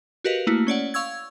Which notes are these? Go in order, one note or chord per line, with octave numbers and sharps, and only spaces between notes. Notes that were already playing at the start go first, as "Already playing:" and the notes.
F#4 G4 A#4 B4 D#5 F5
A3 A#3 E4 F#4
C#4 C#5 D5 F#5
F5 C#6 E6 G#6